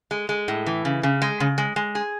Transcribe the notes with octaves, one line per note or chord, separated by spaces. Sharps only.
G#3
G#3
A2
E3
C#3
C#3
G#3
C#3
G#3
G#3
G#4